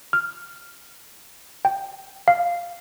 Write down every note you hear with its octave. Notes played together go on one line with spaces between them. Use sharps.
F6
G5
F5